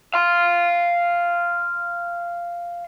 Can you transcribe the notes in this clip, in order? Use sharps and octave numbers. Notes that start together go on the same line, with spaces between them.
F5 C6